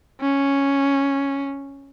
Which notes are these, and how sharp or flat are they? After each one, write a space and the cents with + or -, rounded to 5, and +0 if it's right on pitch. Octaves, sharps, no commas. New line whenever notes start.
C#4 +0